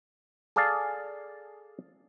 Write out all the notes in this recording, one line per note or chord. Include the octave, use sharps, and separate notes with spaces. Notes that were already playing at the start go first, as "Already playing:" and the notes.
G#4 A4 D5 F5 G#5 A5